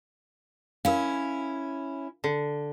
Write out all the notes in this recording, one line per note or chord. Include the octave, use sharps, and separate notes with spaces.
C#4 E4 A#4 F5
D3